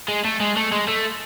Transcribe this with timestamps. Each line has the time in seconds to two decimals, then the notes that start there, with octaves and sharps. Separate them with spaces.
0.08 G#3
0.25 A3
0.40 G#3
0.56 A3
0.72 G#3
0.88 A3